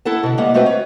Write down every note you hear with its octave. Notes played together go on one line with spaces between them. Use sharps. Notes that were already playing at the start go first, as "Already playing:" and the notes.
E4 A4 F#5 A5
B2 D3
G3 G#3 A#3 B3 F#5
G#3 A3 C4 F#4 B4 F#5
C#5